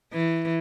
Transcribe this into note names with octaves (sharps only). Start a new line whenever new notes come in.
E3